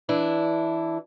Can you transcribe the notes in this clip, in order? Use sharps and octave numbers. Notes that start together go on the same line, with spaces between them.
E3 D4 E4